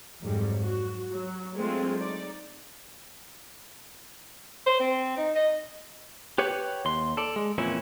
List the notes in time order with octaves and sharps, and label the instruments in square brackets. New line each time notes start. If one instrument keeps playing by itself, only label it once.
[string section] F2 G#2 F#3 G3
F#4
F#3
F#3 G#3 A3 C4 D4 F4
D#4 D5
[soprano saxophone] C5
C4
D#4
D#5
[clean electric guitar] G4 B4 C#5 F#5
D#2 C6
A4 D5
G#3
F2 A#2 E3 C#4 E4